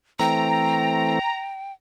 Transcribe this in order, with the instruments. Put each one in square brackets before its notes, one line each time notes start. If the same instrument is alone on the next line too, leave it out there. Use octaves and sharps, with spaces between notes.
[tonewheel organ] E3 A3 C4 [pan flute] G5 [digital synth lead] A#5